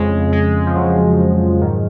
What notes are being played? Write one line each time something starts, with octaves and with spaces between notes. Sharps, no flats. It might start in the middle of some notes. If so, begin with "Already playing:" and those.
Already playing: F2 C#3 G#3
G#3
F3
F2 C#3 F#3
G#2 D#3